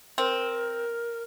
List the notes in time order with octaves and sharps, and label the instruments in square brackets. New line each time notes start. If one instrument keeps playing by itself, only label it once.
[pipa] C4 [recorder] A#4